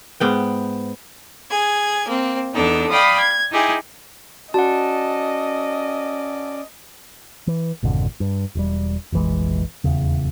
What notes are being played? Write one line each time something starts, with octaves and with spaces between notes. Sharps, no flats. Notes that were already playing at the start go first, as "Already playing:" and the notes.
G#2 B3 G5
G#4 G#6
A#3 C4
E2 B3 D4 D#4 A4
D5 F5 G5 B5 D#6
G#6
D#4 E4 G4 G#4
C#4 F#4 D5 D#5 F#5 A5
E3
G#1 F2 B2 D3
G2
E1 G3
F1 A#1 E3 G#3
D#1 E2 C#3